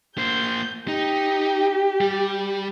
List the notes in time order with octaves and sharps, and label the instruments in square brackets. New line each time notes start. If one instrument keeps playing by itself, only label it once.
[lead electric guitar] A#3 C5 [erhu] G6
[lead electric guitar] D#4 [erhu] G4
[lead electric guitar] G3